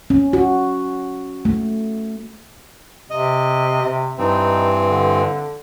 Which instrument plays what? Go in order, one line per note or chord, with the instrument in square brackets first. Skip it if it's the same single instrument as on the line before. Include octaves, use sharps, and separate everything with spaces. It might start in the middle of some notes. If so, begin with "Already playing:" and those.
[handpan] C#4
F#4
A3
[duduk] C3 [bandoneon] D#5
[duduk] C3
[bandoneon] G2 E3 C4 [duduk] D#4
[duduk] D3